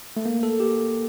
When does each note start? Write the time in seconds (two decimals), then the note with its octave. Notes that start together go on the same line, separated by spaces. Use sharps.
0.17 A3
0.26 A#3
0.43 A4
0.60 G4